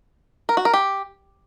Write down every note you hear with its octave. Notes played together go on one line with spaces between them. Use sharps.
A#4
F#4
A#4
G4